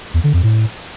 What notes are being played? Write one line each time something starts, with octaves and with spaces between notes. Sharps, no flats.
E2
D3
F2
A2